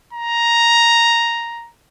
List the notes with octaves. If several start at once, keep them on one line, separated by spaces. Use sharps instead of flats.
A#5